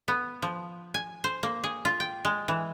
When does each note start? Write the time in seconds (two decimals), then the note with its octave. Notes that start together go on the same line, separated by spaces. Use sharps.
0.08 B3
0.42 F3
0.94 G#5
1.24 C5
1.43 A#3
1.64 G#4
1.85 F4
2.00 G5
2.25 G#3
2.48 E3